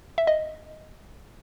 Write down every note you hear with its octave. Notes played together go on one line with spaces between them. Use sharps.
E5
D#5